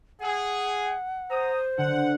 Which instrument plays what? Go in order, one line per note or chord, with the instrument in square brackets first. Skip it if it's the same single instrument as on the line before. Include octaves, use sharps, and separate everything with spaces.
[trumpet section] G#4 [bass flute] F#5
[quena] C5 [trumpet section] A#5 D#6
[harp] D3 [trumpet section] F#5